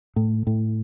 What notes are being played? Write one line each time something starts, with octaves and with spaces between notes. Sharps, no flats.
A2
A2